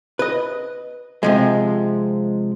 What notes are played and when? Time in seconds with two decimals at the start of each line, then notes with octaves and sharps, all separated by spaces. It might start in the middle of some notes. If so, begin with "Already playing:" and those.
0.19 B4 D#5
1.23 C3 F3 G#3